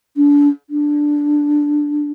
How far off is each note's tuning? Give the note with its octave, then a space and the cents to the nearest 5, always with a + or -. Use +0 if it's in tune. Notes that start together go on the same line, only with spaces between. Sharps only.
D4 -30
D4 +0